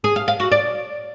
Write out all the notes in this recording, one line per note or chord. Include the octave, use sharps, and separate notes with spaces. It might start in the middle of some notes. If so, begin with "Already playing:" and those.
G#4
F5
F5
F#4
D5